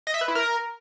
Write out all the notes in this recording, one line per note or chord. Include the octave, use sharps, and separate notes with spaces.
D#5
E5
B4
E4
A#4